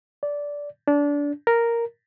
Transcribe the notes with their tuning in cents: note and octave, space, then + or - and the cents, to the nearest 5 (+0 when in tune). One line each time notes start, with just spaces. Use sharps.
D5 -15
D4 -25
A#4 +0